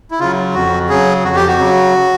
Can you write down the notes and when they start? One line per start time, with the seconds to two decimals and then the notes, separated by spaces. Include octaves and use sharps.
0.11 E4
0.20 C#3 F#3 F4
0.54 F2 F#4
0.89 C#3 F#3 G#4
1.23 F2 F#4
1.36 G4
1.47 F#4
1.58 C#3 F#3